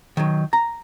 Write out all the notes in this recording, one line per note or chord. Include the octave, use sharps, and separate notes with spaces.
D#3 F#3
A#5